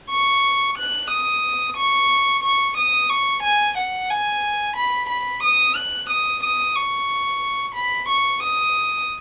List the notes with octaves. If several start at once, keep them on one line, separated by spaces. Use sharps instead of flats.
C#6
F#6
D#6
C#6
C#6
D#6
C#6
G#5
F#5
G#5
B5
B5
D#6
F#6
D#6
D#6
C#6
B5
C#6
D#6